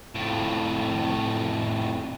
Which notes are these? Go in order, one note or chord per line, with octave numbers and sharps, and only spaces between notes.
F2 A2